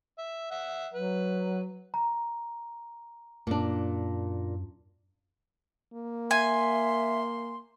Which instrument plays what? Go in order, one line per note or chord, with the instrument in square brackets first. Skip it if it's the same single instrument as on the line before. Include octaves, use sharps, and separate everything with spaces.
[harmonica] E5
E5 F#5
[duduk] F#3 [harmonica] B4
[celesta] A#5
[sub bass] F#2 [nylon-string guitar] A#2 D4
[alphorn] A#3
[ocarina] E5 [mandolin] G#5 [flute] C6